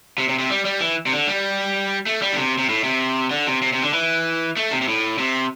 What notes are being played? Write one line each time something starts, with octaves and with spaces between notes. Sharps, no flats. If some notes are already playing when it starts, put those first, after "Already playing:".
C3
C3
C3
G3
G3
E3
C3
D3
G3
A3
G3
D3
C3
C3
A2
C3
D3
C3
C3
C3
D3
E3
A3
C3
C3
A2
C3